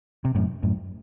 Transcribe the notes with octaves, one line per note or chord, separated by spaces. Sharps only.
C3
F#2 A2
F#2 A2